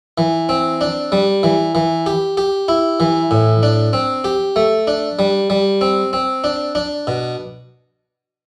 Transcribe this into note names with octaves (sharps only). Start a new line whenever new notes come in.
E3
C4
D4
G3
E3
E3
G4
G4
E4
E3
A2
D4
C4
G4
A3
D4
G3
G3
C4
C4
D4
D4
B2